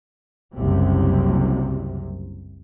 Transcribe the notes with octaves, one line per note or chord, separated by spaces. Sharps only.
F#1 C2 C3